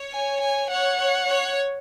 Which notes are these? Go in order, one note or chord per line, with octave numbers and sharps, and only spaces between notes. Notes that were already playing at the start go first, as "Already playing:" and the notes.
Already playing: C#5
G#5
G#5
C#5 F#5
C#5
C#5